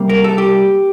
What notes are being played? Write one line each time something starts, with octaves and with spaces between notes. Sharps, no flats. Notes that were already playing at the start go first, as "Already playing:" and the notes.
Already playing: C3 G3 A#3
A#4
A4
G4